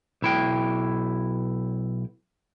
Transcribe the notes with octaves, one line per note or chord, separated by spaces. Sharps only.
B1 E4 G5